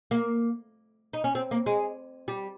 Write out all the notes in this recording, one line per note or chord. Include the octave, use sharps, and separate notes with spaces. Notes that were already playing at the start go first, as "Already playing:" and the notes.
A#3
D#4
C#4
C4
A#3
G#3
G3